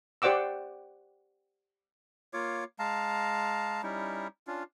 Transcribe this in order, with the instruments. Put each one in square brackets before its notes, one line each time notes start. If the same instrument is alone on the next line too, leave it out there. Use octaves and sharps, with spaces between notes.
[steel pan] G4 C5 D5 F#5 D6 E6
[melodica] A#3 F4 C#5 D6
G#3 F5 A5 A#5
G3 C#4 D#4 E4
C#4 D4 F4